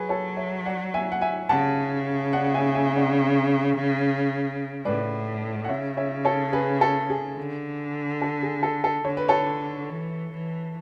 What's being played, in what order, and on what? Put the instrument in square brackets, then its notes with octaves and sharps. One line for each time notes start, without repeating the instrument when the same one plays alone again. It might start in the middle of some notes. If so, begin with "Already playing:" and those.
Already playing: [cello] F#3 [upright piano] G#4 B4
[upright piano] A4 C#5
C#5 E5
D5 F#5
E5 G#5
F#5
E5 G#5
[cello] C#3 [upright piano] F#5 A5
[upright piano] D5 F#5
F#5
E5 G#5
E5 G#5
D5 F#5
[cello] A2 [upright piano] B4 D5
[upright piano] F#5
[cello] C#3 [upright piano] C#5 E5
[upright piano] C#5 E5
A4 C#5
G#4 B4
A4
G#4
[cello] D3
[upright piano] A4
G#4
A4
A4
[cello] D3 [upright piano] C#5
[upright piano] B4
A4 C#5
[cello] E3
E3